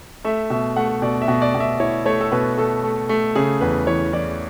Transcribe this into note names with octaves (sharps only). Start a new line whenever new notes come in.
A3 E5
B2 E5
A3 F#5
B2 D5
E5
B2
D5
B2
E5
E4 C#5
A3 C#5
A4
B2 B4
A3 A4
A3
A3
C#3 G#4
E2 B4
E3 C#5
E3 D5